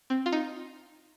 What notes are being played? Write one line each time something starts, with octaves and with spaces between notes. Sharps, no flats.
C4
F4
D#4